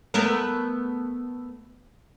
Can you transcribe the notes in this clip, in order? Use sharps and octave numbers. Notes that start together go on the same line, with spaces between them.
A3 B3 A#4